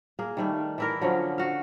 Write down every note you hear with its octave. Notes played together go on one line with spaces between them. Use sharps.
A#3 G#4
D#3 G3 A3
E3 E4 A#4
D3 F3 F#3 C#4
F#4 F5